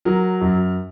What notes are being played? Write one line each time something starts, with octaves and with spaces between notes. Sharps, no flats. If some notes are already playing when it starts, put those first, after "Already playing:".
F#3 A#4
F#2